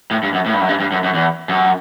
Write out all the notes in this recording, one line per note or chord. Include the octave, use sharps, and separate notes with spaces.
A2
G2
F#2
A2
G2
F#2
G2
G2
F#2
F#2
E2
F#2